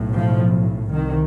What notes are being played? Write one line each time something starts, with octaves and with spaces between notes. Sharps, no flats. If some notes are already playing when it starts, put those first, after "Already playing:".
Already playing: B1 A2
F3
C2 C3 D#3